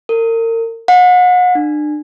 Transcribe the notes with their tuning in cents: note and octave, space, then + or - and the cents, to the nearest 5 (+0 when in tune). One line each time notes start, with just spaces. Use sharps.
A#4 -35
F#5 -35
D4 +35